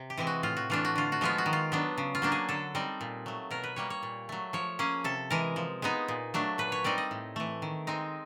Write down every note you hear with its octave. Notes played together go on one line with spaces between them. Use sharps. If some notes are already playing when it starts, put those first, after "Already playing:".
Already playing: C3
G4
E3 G#3 C4
F#4
A2 F4
F#4
E3 A3 D4 F4
F#4
D3 F4
F#4
F3 G#3 B3 F4
F#4
D#3
F4
F#3 B3 D4
C#3
F4
F#3 A#3 D4
G#4
D3 A4
G3 C4 D#4
A#2
F#3 A3
B2 A#4
B4
G3 A#3 C#5
C#5
A#2
F#3 A3
F3 C#5
A#3 C#4 G#4
C3 A4
E3 G#3 A#4
F3
G#3 B3 D#4
A#2
F#3 A3 D4
A#2 B4
C#5
G3 C4 D#4 D5
D#5
A2
E3 A3
D#3
G#3 C4 D#4